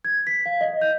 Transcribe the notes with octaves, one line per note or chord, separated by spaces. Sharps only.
G#6
B6
F5
D#5
G6